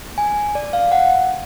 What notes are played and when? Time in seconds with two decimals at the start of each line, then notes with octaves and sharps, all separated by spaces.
0.18 G#5
0.55 D5
0.73 F5
0.92 F#5